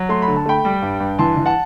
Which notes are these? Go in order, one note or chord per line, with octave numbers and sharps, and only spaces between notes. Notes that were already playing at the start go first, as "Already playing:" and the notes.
Already playing: F#3
A3 C6
B5
D3
A5
A3 G5 B5
G3
G2
G2
E3 A5 C6
E3
F#5 A5